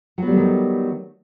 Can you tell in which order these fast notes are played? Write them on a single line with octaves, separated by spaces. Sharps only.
F#3 B3 G3 A3 D#3